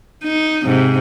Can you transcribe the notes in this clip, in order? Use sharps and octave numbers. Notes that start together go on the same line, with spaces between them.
D#4
G#2 C3